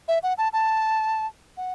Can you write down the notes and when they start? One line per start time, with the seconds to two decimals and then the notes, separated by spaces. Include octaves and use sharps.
0.08 E5
0.23 F#5
0.38 A5
0.53 A5
1.57 F#5